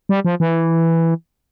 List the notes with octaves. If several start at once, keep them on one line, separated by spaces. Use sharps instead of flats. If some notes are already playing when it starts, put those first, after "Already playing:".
G3
F3
E3